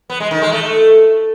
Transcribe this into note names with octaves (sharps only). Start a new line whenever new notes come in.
B3
G#3
D#3
G#3
A3